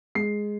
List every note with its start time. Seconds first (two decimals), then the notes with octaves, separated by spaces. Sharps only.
0.15 G#3 C7